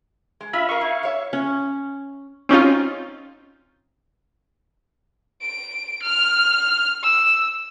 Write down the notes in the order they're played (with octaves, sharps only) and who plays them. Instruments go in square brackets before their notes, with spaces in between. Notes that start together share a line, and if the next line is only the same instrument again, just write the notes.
[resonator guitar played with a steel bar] G#3
[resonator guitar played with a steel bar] F4 [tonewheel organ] E5 B5
[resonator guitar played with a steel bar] A#4 D#5 [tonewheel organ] F5 C#6
[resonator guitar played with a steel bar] E4
C#5 E5
[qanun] C#4
[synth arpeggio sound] C4 C#4 D#4 F4
[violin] D7
F6
E6